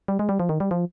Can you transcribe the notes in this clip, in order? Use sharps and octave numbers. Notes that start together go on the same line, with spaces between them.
G3
G#3
G3
F3
D#3
G3
F3